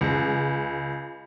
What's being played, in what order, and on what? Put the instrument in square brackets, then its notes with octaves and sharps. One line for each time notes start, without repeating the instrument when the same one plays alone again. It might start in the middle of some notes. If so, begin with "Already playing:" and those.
[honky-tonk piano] C#2